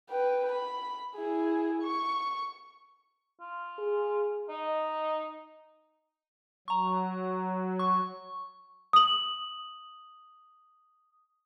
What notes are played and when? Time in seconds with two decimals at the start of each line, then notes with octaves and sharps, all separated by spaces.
0.10 B4 G5
0.52 B5
1.16 E4 G#4
1.82 C#6
3.40 F4
3.78 G#4
4.49 D#4 D#5
6.68 F#3 A#5 C#6
7.79 C#6
8.93 D#6 F#7